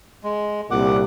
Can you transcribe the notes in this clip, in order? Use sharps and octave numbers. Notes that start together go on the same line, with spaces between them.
G#3
C2 A#2 F#5 D6